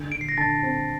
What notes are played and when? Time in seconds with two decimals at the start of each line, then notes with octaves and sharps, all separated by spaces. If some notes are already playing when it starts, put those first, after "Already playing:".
Already playing: D3
0.12 D3 D7
0.21 C7
0.29 A#6
0.37 D3 A5 A6
0.63 C4